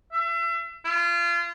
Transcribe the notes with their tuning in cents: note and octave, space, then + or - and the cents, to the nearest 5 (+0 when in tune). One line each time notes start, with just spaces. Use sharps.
E5 +35
F4 -30